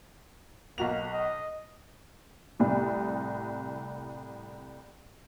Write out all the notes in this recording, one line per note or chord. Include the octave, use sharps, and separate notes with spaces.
B1 A#3 F#4 F7
D#5
C2 A2 C3